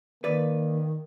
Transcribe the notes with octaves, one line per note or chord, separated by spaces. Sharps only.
D#3 A#3 B4 D5